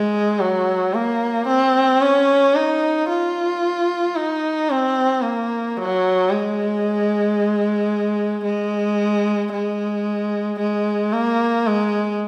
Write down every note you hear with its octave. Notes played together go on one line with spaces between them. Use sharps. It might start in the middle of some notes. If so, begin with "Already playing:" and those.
Already playing: G#3
F#3
A#3
C4
C#4
D#4
F4
D#4
C4
A#3
F#3
G#3
G#3
G#3
G#3
A#3
G#3